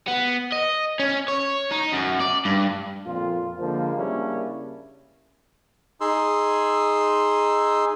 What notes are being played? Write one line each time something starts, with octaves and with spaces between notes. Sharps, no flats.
B3
D#5
C#4
C#5
D#4
F#2
D5
G2
F2 A#2 F4
D3 F3 G#3 A#3
C#3 G3 A#3 C#4 D4 E4
D#4 G#4 C6 E6